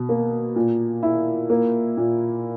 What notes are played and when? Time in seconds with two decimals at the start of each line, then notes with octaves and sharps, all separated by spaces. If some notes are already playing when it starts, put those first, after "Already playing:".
Already playing: B2
0.09 A#3
0.56 A#2
1.03 E4
1.50 A#3
1.97 A#2